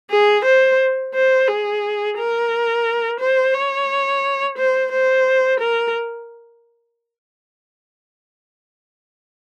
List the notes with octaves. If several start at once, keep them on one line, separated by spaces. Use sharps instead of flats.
G#4
C5
C5
G#4
A#4
C5
C#5
C5
C5
A#4